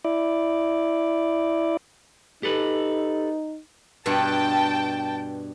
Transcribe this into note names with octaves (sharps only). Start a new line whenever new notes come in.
E4 D5
D#4 G4 A4 B4
G2 B2 F#5 G5 A5